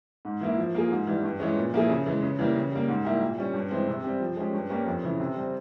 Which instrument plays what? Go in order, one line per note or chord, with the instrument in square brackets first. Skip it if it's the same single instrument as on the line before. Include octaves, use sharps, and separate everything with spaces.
[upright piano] G#2
E3 A#3 E4
F3
A#3 F4 G#4
G#2
E3 G3
G2
E3 G#3 C#4
A#2
F3 A#3 E4 G#4
C#3
E3 G#3
C#3
E3 G3 A#3
C#3
G3 A#3
G#2
G3 A#3 E4 G4
A#2
G3 C#4
G2
E3 G#3 C4
C3
G3 C4 G4
F3
G#3 C#4 G4
G2
G3 A#3 C#4 G4
F2
C#3 E3
C3
G3 C4